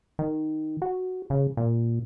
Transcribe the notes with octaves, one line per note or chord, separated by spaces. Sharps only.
D#3
F#4
C#3
A#2